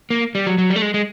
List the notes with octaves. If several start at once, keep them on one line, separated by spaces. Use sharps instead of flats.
A#3
G3
F#3
F#3
G3
A3
G#3
G#3